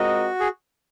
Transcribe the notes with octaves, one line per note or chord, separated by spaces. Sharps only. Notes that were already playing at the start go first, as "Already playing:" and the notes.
Already playing: G#3 C4 F4 F#4 A#4 D#5
G#4